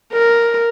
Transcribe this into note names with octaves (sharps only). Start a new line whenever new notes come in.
A#4